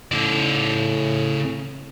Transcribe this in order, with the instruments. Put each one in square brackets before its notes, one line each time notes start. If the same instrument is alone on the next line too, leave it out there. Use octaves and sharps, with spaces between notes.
[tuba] A2 [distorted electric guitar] C#3 D5